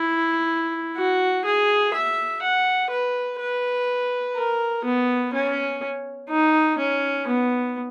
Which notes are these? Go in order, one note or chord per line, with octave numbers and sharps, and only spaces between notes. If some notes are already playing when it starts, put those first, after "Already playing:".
Already playing: E4
F#4
G#4
E5
F#5
B4
B4
A#4
B3
C#4
D#4
C#4
B3